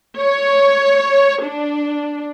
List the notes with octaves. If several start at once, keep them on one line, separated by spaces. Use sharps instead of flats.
C#5
D4